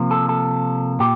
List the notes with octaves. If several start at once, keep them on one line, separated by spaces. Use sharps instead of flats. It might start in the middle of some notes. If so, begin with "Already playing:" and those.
Already playing: C3 F3 A#3
A4
A4
A#2 G4